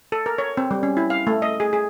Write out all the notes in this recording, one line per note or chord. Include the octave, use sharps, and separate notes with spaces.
A4
A#4
C#5
C4
G3
C#4
E4
F5
A3
D#5
G#4
G#4